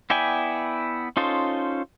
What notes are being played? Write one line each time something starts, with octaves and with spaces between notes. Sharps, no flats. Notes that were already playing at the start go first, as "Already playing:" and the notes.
B3 E4 D5 G5 G#5
C#4 D#4 F4 A4 C5